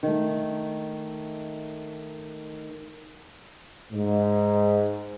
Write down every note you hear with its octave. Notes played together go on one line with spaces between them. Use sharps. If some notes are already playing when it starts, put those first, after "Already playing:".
D#3 A3
G#2